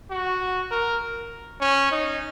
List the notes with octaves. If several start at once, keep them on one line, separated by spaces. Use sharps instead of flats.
F#4
A#4
C#4
D#4